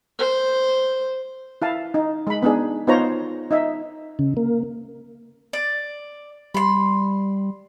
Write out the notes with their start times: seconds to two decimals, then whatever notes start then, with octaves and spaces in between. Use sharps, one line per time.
0.19 C5
1.62 E4 F5 A5
1.94 D#4
2.27 G#3 B5
2.42 B3 D4 D#4 G#4
2.87 B3 D#4 F4 C5 C#5 A#5
3.51 D#4 D#5 E5
4.19 C#3
4.37 A#3
5.53 D5
6.54 G3 B5 C6